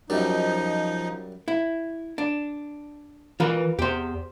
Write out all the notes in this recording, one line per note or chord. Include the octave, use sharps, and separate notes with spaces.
F#2 F3 G3 D#4
E4
D4
E3 F4 A#4 B4
E2 G4 C5